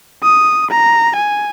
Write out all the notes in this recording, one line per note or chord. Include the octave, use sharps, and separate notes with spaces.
D#6
A#5
G#5